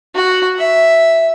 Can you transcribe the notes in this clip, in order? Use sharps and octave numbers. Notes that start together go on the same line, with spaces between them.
F#4
E5